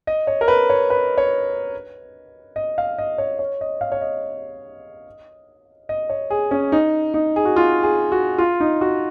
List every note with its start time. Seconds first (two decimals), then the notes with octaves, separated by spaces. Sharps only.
0.07 D#5
0.27 C#5
0.41 A#4
0.48 B4
0.70 C#5
0.90 B4
1.18 C#5
2.56 D#5
2.78 F5
2.98 D#5
3.18 C#5
3.39 C#5
3.61 D#5
3.81 F5
3.92 C#5
4.02 D#5
5.89 D#5
6.10 C#5
6.30 G#4
6.51 C#4
6.72 D#4
7.14 D#4
7.36 G#4
7.45 F#4
7.56 F4
7.83 G#4
8.12 F#4
8.38 F4
8.60 D#4
8.81 F#4